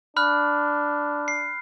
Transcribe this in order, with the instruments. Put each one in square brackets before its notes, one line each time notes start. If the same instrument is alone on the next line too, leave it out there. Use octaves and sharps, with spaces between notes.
[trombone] D4 [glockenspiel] B5 F6 F#6
[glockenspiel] C7